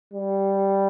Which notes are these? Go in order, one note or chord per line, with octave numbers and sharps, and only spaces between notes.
G3